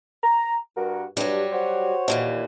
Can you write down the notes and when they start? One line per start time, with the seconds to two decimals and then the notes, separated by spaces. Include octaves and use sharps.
0.23 A#5
0.76 G2 F#4 A#4
1.17 G2 F#3 G3
1.53 F#4 C5 C#5
2.08 D#2 A#2 E3